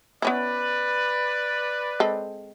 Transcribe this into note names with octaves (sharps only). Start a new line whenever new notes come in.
B3 C#4 E4 B4 D5
G#3 C4 A4